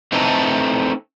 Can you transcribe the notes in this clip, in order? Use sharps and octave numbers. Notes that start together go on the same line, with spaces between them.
A3 C4 D#4 E4 A4 B4